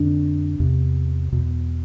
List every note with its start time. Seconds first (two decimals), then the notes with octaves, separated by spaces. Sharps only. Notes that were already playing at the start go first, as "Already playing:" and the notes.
Already playing: F2 D3 D4
0.60 E2 C3
1.32 E2 B2